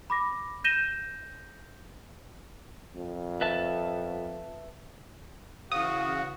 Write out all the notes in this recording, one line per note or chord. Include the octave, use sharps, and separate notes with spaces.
B5 D6 A#6
G6 A#6 D#7 E7 G7
F2
B4 E5 A5
C#3 E3 F#4 F5 D#6